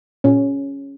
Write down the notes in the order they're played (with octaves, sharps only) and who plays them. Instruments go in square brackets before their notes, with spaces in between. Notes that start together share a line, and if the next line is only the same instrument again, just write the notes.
[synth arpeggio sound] A#2 [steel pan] C#4